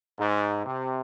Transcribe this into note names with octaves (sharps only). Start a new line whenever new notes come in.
G#2
C3